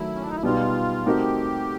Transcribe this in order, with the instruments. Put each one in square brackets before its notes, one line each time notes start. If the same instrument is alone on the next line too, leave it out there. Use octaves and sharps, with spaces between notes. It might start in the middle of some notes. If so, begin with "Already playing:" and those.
Already playing: [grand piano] D#3 F#3 A3 [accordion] E4
[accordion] C#4
D4
D#4
E4
[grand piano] B2 G3 B3 D#4 [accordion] F4
[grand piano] A3 C4 D#4 F#4 A#4 [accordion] G4